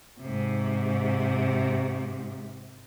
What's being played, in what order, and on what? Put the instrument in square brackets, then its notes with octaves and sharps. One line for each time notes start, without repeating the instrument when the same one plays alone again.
[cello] G#2 C3